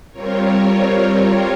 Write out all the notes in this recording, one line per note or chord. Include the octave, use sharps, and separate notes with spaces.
G3 C4 F4 A#4 C#5